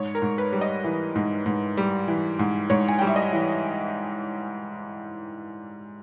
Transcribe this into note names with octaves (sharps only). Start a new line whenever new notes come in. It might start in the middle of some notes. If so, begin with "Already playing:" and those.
Already playing: G#2 C#5
A#4
G#2
B4
G3
D#5
E3
G#2
G#2
G3
E3
G#2
G#2 C#5
G#5
G3 G5
E5
D#5
E3